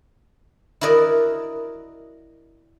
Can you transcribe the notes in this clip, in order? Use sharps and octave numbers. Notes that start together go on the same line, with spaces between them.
E4 F#4 A#4 D5 D#5